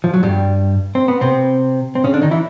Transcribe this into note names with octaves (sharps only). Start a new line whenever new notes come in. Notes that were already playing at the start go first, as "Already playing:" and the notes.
F3
F#3
G2 G3
C4
B3
C3 C4
C4
C#3 C#4
D3 D4
D#3 D#4
E3 E4